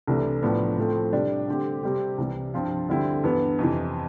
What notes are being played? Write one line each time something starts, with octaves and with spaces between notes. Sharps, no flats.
C2 C3 E3 A3 D4
A2 F3 B3 D4
A2 F3 A3 C4
C3 G3 D4 G4 D5
D3 A3 C4 G4
C3 G3 C4 G4
C2 C3 E3 G3
G2 F3 C4 F4
D2 D3 G3 C4 E4
G2 E3 B3
F2 C3 E3